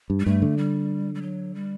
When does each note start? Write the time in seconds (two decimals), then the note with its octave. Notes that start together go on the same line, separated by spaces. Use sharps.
0.10 G2
0.20 G3
0.26 G2 A3
0.42 D3
0.58 G3
1.15 G3
1.22 F#3
1.55 G3